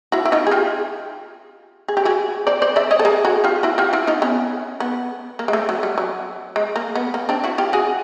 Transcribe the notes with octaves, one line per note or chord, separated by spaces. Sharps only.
E4 F#4
E4
D#4 F4
G#4
F4 G4
G#4
G4
F#4 G#4
C5 D5
C5 D5
D5 E5
C#5 D#5
A4
G#4 A#4
F#4 G#4
F4 G4
E4 F#4
F4 G4
E4 F#4
D#4 F4
B3 C#4
B3
A#3
G#3
A3
F#3
G3
F#3
G#3
A#3
B3
A#3
C4 D4
E4 F#4
F4 G4
F#4 G#4